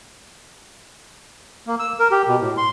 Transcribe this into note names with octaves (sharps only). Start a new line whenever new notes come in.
A#3
E6
A#4
G4
B2
A2
C6